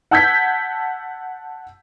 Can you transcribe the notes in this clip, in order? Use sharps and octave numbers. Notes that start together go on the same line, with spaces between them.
F#5 A5 E6 G6 G#6 B6